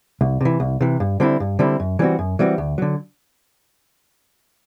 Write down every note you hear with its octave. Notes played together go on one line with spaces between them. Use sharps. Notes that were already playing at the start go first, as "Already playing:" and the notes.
C2
C3 E3
C2
C3 E3
G2
D3 G3 C4 E4
G2
D3 G3 C4 E4
F#2
E3 G3 C4 F#4
F#2
E3 G3 C4 F#4
D2
D3 F#3